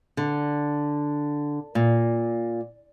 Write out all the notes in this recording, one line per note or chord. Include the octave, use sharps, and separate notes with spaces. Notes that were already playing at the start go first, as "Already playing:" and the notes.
D3
A#2